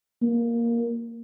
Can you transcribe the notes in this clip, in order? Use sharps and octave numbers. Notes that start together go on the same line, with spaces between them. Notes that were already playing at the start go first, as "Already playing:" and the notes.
A#3